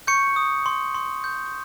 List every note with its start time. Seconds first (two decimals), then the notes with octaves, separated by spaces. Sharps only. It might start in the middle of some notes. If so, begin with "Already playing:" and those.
0.07 C#6 G6 C#7
0.36 D#6
0.66 C6
0.94 C6
1.24 G6